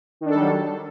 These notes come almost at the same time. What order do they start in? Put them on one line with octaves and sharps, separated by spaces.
D#3 D4 A4 G3 F#3